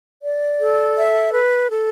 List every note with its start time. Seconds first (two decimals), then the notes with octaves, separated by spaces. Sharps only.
0.22 D5
0.59 A4
0.96 E5
1.33 B4
1.71 A4